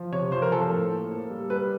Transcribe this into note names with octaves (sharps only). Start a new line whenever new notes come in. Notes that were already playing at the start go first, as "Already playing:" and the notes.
Already playing: F3
C3 C#5
F3 C5
A#4
F3 A4
A4
A2
A#3
A#3
G3
G3 B4